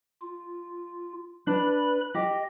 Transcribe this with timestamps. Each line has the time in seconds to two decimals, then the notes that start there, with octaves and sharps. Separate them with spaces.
0.21 F4
1.47 D4 B4 B5
2.15 G4 D#5